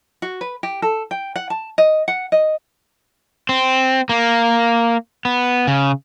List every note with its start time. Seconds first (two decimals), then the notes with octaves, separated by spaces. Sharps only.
0.22 F#4
0.41 B4
0.63 G4
0.82 A4
1.11 G5
1.36 F#5
1.50 A5
1.78 D#5
2.08 F#5
2.32 D#5
3.49 C4
4.09 A#3
5.25 B3
5.67 C#3